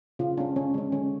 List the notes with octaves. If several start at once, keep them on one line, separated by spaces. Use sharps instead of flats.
C#3 F4
G#3 C#4 D4
D3 C#4
G#3 C#4
D3 C#4